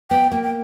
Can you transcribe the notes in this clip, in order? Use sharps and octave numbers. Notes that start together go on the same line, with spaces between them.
B3 G5
A#3 G5
G5